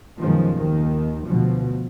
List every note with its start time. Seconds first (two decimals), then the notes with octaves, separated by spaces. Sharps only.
0.19 F#2 B2 D#3 F3 G#3
0.55 D#2 D#3
1.26 D2 B2 F3